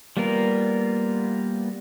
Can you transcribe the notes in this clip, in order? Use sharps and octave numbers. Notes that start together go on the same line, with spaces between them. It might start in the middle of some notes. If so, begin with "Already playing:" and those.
G3 A#3 B3 F4 A#4